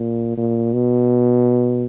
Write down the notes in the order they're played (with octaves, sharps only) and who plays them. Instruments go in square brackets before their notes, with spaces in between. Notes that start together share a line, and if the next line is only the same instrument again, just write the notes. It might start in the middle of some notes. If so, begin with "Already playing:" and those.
Already playing: [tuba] A#2
A#2
B2